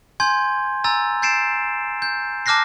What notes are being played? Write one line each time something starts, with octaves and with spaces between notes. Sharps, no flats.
G#5 C6 G6 G#6
G#5 A#5 E6 A6
G6 A6 C7 D7 E7
G6
A5 D6 F6 F#6 A#6 C7